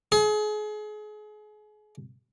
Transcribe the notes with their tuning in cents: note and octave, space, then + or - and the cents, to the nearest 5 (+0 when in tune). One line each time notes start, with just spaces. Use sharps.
G#4 +35